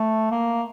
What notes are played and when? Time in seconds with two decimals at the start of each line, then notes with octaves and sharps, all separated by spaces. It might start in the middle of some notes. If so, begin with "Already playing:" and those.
Already playing: A3
0.31 A#3